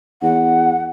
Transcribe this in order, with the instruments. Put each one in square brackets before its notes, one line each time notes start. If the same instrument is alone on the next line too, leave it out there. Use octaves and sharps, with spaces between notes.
[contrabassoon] E2 [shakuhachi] F#5